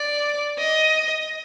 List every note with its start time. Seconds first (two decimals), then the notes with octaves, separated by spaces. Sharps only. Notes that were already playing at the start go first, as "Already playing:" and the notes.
Already playing: D5
0.59 D#5